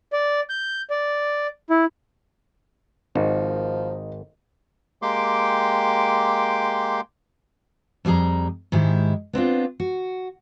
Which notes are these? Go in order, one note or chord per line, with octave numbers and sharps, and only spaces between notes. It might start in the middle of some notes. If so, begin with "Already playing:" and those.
D5
G6
D5
E4
G#1 F3 D#4
G#3 A#3 G4 G5 C6 D6
F2 G3 F4 G#4 A#5
G#2 D#3 G#3 E4 G4
B3 C4 D4 F4
F#4